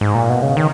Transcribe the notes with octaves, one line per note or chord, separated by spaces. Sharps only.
G#2
A#2
B2
C#3
D#3